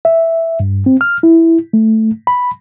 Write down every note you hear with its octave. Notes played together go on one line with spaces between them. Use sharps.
E5
G2
C4
F6
E4
A3
B5